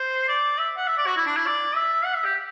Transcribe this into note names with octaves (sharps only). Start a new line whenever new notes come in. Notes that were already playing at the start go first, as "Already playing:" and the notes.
Already playing: C5
D5
E5
F#5
E5
D5
F#4
E4
D4
E4
D5
E5
F#5
E5
G4